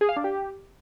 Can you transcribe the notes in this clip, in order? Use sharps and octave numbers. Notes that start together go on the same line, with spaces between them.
G#4
F5
D4
G4